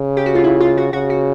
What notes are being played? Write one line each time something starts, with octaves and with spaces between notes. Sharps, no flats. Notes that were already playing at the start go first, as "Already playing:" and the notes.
Already playing: C#3
G4
F#4
F4
E4
F4
F#4
C#3 F#4
F#4